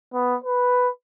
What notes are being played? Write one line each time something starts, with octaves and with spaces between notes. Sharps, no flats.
B3
B4